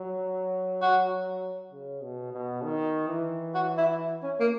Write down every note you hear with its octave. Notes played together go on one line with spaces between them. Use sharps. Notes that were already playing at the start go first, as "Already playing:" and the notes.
Already playing: F#3
F#4
C#3
B2
B2
D#3
E3
F#4
E4
C#4
A#3